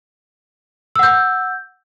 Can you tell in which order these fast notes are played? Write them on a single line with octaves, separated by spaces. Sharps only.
E6 F#5 G6